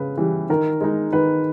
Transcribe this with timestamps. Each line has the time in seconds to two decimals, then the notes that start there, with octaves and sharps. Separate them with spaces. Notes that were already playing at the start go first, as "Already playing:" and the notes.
Already playing: C#3 B4
0.18 E3 G3
0.50 D#3 A#4
0.81 G#3 D#4
1.13 D#3 B4